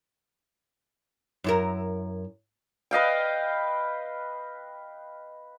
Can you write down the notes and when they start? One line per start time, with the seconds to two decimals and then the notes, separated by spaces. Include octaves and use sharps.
1.44 F#2 E4 A#4
2.91 B4 D#5 F5 G5